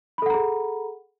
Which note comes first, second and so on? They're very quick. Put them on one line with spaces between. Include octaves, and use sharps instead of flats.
B5 A4 F#5 A#5 G#4